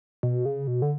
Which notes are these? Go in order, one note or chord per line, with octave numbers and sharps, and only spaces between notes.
B2
C#3
B2
D3